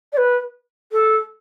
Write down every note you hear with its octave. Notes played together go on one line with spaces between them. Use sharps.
D5
B4
A4